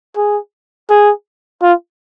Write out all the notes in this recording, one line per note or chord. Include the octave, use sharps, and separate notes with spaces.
G#4
G#4
F4